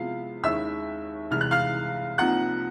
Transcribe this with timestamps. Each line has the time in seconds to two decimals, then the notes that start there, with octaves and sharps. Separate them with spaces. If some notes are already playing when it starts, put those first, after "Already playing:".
Already playing: C3 F3 G#3 B3 E4 F5
0.43 D#2 D#3 G#3 C#4 E4 E5 E6
1.30 C2 C3 E3 G#3 F6
1.41 F#6
1.51 F5 F6
2.18 C2 C3 F3 A#3 D#4 F#5 F#6